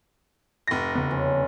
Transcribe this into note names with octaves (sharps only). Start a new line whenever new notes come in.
F1 A#6
E2 C#3 B3
F3 C#4 D4